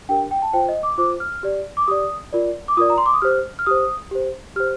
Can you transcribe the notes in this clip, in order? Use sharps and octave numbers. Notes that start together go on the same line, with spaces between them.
D4 G4 A#4 G5
G5
A5
F4 C5 G5
D#5
D6
F4 C5 D6
F6
G4 D5
D6
G4 D5 D#6
F4 A#4 D5
D6
F4 A#4 D5 D#6
A#5
C6
D6
D#6
G4 C5 F6
F6
G4 C5 D#6
G4 C5
G4 C5 F6